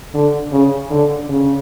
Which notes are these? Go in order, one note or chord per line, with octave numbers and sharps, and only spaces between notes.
D3
C#3
D3
C#3